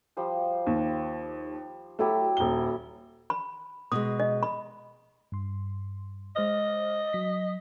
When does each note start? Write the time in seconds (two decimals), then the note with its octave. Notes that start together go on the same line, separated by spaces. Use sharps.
0.17 F3 G3 C5
0.67 D#2
1.99 F#3 A3 E4 G4
2.37 D#1 G7
3.30 B5
3.92 B2 G#3 D#6
4.20 D#5
4.43 B5
5.32 G2 C6
6.36 G#3 C5 D#5 F6
7.13 F#3 B6